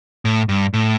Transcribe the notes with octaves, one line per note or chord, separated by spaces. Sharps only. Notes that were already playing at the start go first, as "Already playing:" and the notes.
A2
G2
A2